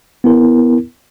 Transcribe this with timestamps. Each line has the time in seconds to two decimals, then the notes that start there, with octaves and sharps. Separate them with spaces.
0.24 B3 E4 A#4